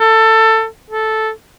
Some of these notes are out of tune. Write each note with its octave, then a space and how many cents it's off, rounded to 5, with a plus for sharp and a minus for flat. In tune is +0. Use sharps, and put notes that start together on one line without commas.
A4 +20
A4 -5